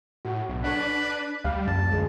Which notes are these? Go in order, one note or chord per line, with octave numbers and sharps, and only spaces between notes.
A2 F#4
B1
D4 A4 B4 C#5 F#5
D2 G3 F5
A#1 F#2 A5
D2 G#3